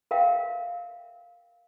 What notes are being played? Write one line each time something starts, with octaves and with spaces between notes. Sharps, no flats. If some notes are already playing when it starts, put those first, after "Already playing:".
A#4 E5 F5 G5